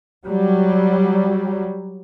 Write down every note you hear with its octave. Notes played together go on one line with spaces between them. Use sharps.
F#3 G3